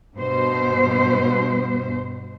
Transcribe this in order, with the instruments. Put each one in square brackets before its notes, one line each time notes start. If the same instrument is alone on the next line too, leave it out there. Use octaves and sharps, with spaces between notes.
[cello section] G2 B2 C5